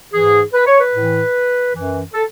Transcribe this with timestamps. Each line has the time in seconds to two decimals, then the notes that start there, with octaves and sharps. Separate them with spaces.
0.13 G#2 E3 G#4
0.54 B4
0.66 C#5
0.80 B4
0.94 A2 E3
1.73 F#2 E3
2.14 A4